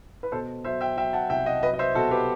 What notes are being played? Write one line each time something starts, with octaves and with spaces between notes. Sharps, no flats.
B4
B2 A4 C5
F#3 C5 E5
E5 G5
F#3 E5 G5
F#5 A5
C2 E5 G5
D#5 F#5
F#3 B4 D#5
D#5
C5 E5
B2 F#4 A4
G4 B4